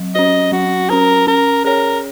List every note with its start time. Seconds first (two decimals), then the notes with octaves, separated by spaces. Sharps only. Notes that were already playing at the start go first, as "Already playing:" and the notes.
Already playing: F#3
0.15 C#4 F#4 D#5
0.52 F#3 F#4
0.90 C#4 F#4 A#4
1.27 C#4 A#4
1.65 G#4 A#4 C#5